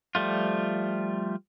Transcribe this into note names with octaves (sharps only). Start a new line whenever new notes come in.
F3 G3 A3 F4